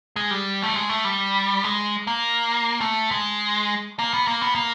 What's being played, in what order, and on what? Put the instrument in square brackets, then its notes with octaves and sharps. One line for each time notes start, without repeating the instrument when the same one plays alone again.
[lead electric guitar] G#3
G3
A3
G#3
A3
G3
G#3
A#3
A3
G#3
A#3
B3
A#3
B3
A#3